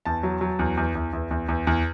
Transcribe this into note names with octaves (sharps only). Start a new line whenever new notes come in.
E2 A5
F#3
F#3
E2
E2
E2
E2
E2
E2
E2